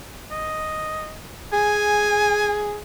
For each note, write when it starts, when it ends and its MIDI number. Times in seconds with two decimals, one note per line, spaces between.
0.31 1.14 75
1.53 2.80 68
1.53 2.60 80